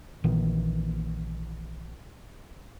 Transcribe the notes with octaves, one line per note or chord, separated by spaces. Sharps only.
A#1 A#2 D#3 E3